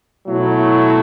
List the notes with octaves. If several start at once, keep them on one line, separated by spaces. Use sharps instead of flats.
B2 F#3 A3 E4